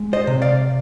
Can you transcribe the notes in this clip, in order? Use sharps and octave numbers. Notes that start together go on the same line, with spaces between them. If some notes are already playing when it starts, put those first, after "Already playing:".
Already playing: G#3
C5 D#5
C3
D5 F5